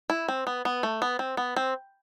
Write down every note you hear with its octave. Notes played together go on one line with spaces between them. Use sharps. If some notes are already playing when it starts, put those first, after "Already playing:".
E4
C4
B3
B3
A3
B3
C4
B3
C4